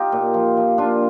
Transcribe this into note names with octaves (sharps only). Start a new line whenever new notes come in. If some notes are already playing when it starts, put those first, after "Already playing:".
Already playing: D#4 F4 G4
A#2
F3
F3
A#2 D4 F4